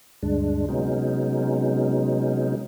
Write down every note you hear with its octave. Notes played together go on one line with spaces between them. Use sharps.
D2 G2 G#3 D4
C3 F#3 G#3 B3 C#4 D#4